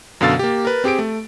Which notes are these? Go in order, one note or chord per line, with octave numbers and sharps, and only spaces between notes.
F#2 B2 D3 F5 E6 A6
A#3 G4
A#4 B4
C4 G4 G#4 D7
A3